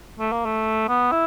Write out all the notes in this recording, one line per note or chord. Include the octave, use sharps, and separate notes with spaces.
A3
A#3
A3
B3
E4